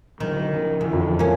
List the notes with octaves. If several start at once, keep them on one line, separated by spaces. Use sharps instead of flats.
D3 D#3 F#3
C#3 F3
E2 D3 E3
F2
A#3 C#4